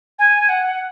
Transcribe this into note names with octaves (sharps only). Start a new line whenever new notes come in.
G#5
F#5